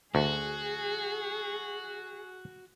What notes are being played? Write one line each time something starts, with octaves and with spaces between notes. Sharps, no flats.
D2 F#4 G#4